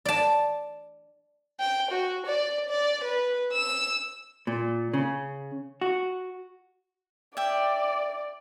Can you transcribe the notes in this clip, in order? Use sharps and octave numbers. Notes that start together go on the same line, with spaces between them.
D5 A5
G5
F#4
D5
D5
B4
E6
A#2
C#3
F#4
D5 E5 G5